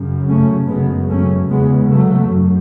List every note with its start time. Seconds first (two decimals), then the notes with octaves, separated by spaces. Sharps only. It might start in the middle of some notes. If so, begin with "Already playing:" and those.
Already playing: F#2 C#3
0.28 A3 C#4
0.68 F#2 C#3 G#3 B3
1.08 A3 C#4
1.49 E2 C#3 G#3 B3
1.89 F#3 A3
2.29 F#2